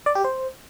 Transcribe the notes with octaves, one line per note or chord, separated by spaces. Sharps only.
D5
G4
C5